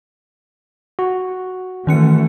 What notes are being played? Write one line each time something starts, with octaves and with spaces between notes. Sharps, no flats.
F#4
D#3 E3 A3 C#4 C#7